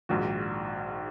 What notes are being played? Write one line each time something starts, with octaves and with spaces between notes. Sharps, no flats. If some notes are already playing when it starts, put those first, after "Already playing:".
A#1 G#2 D#3 F#4